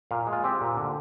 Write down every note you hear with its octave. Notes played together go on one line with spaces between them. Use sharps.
A#2 F5
G#3
F4
C4 G4
A#2
D3